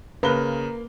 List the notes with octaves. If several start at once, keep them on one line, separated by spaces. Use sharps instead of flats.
C#3 A#3 B4 A#5 G7